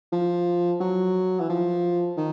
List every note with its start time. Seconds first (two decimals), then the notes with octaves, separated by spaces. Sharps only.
0.12 F3
0.80 F#3
1.40 E3
1.49 F3
2.17 D#3